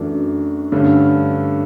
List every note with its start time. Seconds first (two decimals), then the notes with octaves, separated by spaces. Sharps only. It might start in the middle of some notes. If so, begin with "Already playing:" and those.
Already playing: F#2 E3 A3 D4 F#4
0.72 G2 D3 A3 C#4